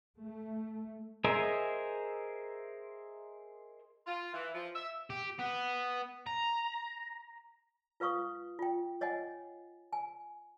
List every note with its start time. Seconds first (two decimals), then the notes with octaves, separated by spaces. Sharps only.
0.20 A3
1.24 G#4 A#4 C5 D#5 E5
4.07 F4
4.33 E3
4.54 F3
4.75 E5
5.10 G4
5.39 B3
6.27 A#5
8.00 F4 B4 F5 C#6 D#6
8.59 F4 G5
9.01 C#5 D#5 F#5 G#5
9.93 G#5